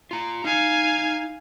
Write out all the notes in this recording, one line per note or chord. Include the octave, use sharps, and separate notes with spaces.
F4 A#5
D#4 F5 G#5